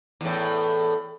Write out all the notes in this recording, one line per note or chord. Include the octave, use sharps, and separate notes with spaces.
E2 A2